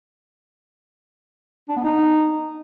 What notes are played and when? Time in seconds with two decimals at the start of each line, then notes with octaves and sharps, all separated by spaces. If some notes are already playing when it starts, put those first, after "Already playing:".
1.69 D4
1.76 B3
1.84 D#4